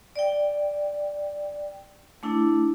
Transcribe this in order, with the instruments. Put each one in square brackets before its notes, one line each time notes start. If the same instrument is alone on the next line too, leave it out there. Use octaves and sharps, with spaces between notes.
[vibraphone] D5 G5
A3 D4 E4